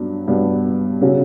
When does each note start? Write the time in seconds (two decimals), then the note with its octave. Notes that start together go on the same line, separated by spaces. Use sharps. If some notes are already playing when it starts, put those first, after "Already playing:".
Already playing: G2 F#3 B3 D4
0.28 G2 F#3 B3 D4
1.01 C#3 F#3 C#4